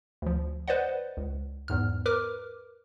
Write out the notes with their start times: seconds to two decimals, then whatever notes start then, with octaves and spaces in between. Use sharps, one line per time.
0.22 D2 F3
0.68 B4 C5 D5 D#5 F#5
1.17 C#2
1.68 E2 G#2 F6
2.06 A#4 B4 D6 F6